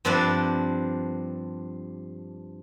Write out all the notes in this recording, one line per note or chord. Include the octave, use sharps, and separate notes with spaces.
G2 F3 C4 D4 B4 D5